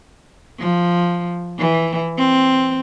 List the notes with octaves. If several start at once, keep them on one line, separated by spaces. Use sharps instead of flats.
F3
E3
C4